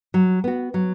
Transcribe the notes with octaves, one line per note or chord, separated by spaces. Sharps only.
F#3
B3 F#4
F#3